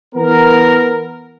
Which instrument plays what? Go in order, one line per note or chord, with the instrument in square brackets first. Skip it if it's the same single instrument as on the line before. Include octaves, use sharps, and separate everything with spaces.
[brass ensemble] E3 B3 A#4